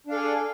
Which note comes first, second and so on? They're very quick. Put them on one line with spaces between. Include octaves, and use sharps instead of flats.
D4 F5 A4 G#4